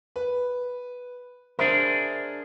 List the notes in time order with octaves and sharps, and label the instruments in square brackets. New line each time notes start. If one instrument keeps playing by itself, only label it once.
[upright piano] B4
[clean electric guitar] D4 G#4 A#4 [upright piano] C5 E5